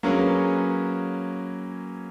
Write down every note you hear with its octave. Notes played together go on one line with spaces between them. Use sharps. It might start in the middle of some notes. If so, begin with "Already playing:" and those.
F#3 A#3 C#4 G#4 B4